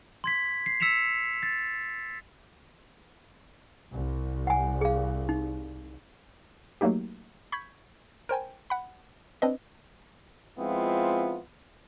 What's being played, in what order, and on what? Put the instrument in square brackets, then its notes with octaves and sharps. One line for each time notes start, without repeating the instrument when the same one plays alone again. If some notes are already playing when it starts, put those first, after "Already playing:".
[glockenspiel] C6 G#6 B6
C7
E6 B6 C#7 E7 F7
A6
[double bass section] C2
[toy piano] F#5 G#5
G#4 F5
D#4
[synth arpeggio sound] F#3 A3 A#3 D#4 G4
B5 C#6 G6 G#6 B6
A#4 C5 G5 G#5
F#5 B5
C4 D4 B4 D#5
[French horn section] F3 G#3 B3 C4 E4 F4